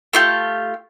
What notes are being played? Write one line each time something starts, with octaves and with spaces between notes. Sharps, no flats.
A3 F4 G4